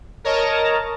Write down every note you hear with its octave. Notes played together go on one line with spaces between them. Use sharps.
A#4 C#5 D#5 A5 A#5